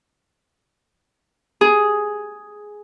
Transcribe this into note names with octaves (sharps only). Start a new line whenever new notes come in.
G#4